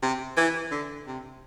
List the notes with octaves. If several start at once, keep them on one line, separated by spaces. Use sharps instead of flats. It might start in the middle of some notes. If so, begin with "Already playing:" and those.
C3
E3
D3
C3